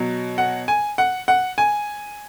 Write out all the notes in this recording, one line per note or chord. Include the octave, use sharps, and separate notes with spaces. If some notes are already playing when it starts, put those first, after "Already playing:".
Already playing: B2 F#3
F#5
G#5
F#5
F#5
G#5